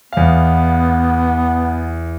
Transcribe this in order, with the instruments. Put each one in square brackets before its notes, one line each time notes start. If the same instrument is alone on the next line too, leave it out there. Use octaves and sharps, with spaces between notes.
[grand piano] E2 F5 [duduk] B3